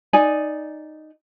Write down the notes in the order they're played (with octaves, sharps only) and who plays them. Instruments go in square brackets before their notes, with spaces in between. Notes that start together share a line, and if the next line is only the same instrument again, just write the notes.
[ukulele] D#4 D5 G#5